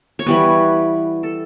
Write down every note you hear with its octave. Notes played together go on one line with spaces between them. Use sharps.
C#5
E3 G3 B3 B4
A4